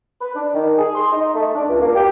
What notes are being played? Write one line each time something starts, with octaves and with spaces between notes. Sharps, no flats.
B4
D4
D#3
G#4
C6
D#4
A3
D4
C#2
A#3
G4